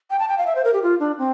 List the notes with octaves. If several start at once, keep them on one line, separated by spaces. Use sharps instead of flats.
G5
A5
G5
F5
E5
C5
A#4
G4
F4
D4
C4